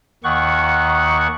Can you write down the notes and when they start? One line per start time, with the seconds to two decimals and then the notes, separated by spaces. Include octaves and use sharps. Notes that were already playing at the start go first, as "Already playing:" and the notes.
0.24 D#2 D#3 F#5 C#6